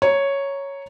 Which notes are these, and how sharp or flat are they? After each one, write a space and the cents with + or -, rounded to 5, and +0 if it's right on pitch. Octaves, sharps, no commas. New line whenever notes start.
C#5 +0 A#5 +0